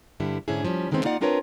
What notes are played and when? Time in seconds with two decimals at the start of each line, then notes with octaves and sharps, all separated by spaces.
0.20 G2 D3 G3 E4
0.48 G#2 D3 C#4 D4 E4 G#4
0.65 F3 G3 C#4
0.91 D3 D#3 G#3 B3 C4
1.04 A#3 D#4 F4 D5 F#5
1.21 C4 D4 F4 A#4 B4 C#5